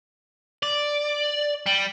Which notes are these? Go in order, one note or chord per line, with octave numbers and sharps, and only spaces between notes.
D5
G3